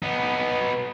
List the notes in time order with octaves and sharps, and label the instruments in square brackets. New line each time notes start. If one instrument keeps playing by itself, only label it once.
[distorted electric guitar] B3 D#4